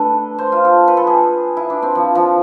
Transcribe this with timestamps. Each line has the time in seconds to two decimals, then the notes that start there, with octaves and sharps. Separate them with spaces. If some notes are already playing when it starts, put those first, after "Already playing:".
Already playing: A3 D4 A4 B4
0.38 C5
0.52 F4
0.65 A4
0.88 B4
0.97 A4
1.07 G#4
1.57 E4
1.70 D4
1.82 C4
1.95 F3
2.15 F3